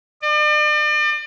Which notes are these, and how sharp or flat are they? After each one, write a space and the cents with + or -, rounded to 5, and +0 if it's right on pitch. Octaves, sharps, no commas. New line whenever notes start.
D5 +40